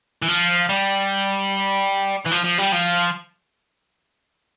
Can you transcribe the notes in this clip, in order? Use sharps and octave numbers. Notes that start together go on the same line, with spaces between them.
E3
F3
G3
E3
F3
F3
G3
F3